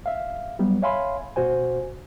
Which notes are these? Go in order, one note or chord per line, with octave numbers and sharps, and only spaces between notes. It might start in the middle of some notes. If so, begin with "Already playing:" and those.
E5 F5
F#3 G3 B3
C#5 E5 F5 G#5 B5 C6
B2 F#4 C5 G#5